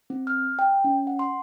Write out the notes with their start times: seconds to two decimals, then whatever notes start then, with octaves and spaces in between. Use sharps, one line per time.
0.10 C4
0.27 F6
0.59 G5
0.84 C#4
1.07 F#5
1.19 C6